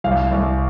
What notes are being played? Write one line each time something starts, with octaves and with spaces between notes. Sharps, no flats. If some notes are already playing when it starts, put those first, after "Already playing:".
C2 F5
C2